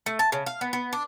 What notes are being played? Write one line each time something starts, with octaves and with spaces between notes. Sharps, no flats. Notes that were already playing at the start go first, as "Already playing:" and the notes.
A3
A5
C#3
F5
B3
B3
D4